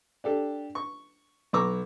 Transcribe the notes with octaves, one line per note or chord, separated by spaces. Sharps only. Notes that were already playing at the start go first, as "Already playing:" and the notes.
D4 G4 A4
C#6
B1 B3 A#5 C#6 D6 E6